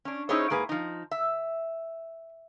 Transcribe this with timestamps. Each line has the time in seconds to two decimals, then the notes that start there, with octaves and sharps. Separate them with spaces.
0.05 C#4 D4
0.29 C#4 D#4 E4 G#4 C5 C#5
0.50 G#2 A#3 G#4 B4
0.69 F3 D#4
1.11 E5